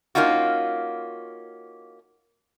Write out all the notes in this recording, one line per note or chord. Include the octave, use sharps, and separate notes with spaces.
A#3 C#4 D#4 F4 F#4